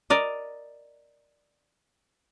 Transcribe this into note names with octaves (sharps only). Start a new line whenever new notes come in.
A#4 D5 D#5